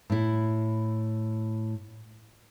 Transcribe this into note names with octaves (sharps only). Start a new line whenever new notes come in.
A2 E4